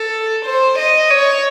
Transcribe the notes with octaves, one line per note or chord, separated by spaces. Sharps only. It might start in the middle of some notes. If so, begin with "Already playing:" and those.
Already playing: A4
C5
D#5
C#5